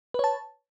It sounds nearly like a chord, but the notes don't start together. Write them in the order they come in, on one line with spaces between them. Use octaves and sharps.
B4 C#5 A5